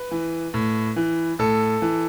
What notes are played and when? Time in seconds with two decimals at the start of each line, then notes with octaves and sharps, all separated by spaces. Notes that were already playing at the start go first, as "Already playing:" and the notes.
Already playing: B4
0.11 E3
0.54 A2
0.96 E3
1.39 A2 A4
1.82 E3